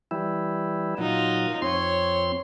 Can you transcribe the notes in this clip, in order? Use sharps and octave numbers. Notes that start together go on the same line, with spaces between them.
E3 G3 E4
A#2 F#3 D#4 F4
F2 C4 C#5 C6